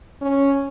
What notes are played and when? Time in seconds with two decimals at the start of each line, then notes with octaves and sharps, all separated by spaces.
0.22 C#4